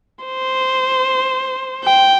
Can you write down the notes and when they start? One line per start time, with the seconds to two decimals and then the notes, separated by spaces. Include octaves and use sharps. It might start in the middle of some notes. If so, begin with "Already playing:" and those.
0.25 C5
1.84 G5